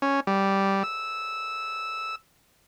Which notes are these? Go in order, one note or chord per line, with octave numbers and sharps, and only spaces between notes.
C#4
G3
E6